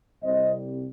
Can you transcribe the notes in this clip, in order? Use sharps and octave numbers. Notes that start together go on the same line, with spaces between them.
C2 C3 G3 C5 D#5